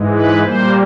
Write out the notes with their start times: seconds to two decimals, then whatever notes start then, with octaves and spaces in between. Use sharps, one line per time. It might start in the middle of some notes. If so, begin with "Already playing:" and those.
Already playing: G#2 E3 G#3
0.11 B4
0.43 A#2 G3 A#3 C5